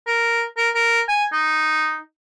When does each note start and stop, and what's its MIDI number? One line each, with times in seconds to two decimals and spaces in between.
0.07 0.43 70
0.57 0.69 70
0.75 1.00 70
1.08 1.25 80
1.33 1.99 63